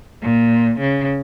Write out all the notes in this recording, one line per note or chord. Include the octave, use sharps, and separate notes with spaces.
A#2
C#3